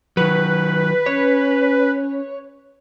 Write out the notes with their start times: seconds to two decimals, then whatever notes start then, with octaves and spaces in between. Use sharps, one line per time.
0.17 D#3 F#3 B4
1.06 C#4 C#5